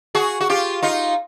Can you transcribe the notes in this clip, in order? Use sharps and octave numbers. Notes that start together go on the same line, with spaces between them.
F#4 G#4
F#4
F4 G4
D#4 F4